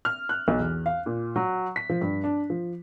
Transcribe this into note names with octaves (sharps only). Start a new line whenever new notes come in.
F6
F#6
B1
E2
F5
A#2
F#3
B6
F3
G2
D4
F3